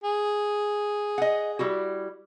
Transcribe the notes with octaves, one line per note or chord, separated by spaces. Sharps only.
G#4
D#5 F#5
G3 E4 F#4